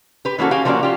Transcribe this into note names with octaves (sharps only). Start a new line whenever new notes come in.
G4 B4
E3 A#3 C#4 F#4 A4
F#4 G4 F5 G#5
F3 G3 A#3 C#4 F#4 D5
F4 G4